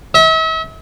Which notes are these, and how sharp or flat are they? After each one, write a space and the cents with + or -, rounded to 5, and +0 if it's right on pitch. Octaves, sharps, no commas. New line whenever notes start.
E5 -40